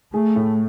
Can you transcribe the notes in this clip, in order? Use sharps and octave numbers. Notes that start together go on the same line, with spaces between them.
A3 G#4
A2